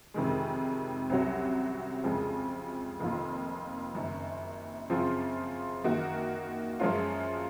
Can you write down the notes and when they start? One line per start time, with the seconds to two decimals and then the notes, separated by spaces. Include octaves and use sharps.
0.14 F2 C3 D#3 G#3
1.10 C2 C3 F#3 C#4 F#4
2.04 F2 C#3 F3 G#3
2.99 F1 F2 D#3 A#3 F4
3.94 F#1 F#2 D#3
4.90 F#2 C#3 F3 C4 F4
5.84 F#2 D#3 A#3 D#4 F#4
6.80 F#2 F3 G#3 C#4 F4